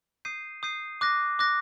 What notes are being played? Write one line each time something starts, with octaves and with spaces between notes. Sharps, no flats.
D#6 G6 C7 D#7
D#6 G6 C7 D#7
D6 F#6 A#6
D6 F#6 A#6